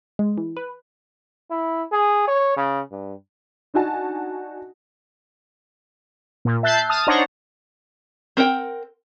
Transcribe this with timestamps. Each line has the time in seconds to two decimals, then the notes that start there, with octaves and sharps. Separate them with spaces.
0.19 G#3
0.38 E3
0.57 B4
1.51 E4
1.92 G#4
2.28 C#5
2.56 C#3
2.91 G2
3.74 D4 D#4 F#4 G#5 A5
6.45 A#2
6.63 E5 A5 F#6 G6 A6 C7
6.89 A5 D#6 F6
7.07 D4 D#4 C5 C#5 F#5 A#5
8.37 C4 A#4 F#5 G5